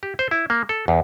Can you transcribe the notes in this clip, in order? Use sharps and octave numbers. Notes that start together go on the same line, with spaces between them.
G4
C5
E4
A#3
A4
E2